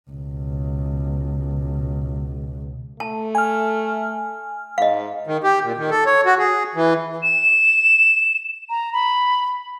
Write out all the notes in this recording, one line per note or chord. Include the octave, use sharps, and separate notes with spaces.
C#2 B2
A3 A5
G#5 F6
G#2 D#5 F5
D#3
G4
A#2
D#3
A4
C#5
F#4
G#4
E3
E7
A#5
B5